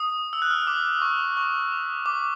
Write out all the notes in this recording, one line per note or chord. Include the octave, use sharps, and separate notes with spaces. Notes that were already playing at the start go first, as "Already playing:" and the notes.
Already playing: D#6
E6
F#6
F6
D#6
D6
C#6
C#6
D6
D6